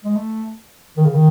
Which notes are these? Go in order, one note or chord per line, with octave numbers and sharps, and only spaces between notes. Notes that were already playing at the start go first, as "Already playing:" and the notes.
G#3
A3
D#3
C#3
D#3